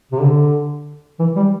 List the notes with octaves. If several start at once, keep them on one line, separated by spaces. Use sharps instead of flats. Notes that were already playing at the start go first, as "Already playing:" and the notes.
C3
D3
E3
G3